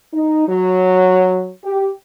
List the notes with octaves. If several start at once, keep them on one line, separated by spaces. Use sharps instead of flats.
D#4
F#3
G4